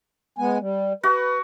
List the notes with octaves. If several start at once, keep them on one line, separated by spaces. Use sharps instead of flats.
G#3 B3 G#5
G3
F#4 B4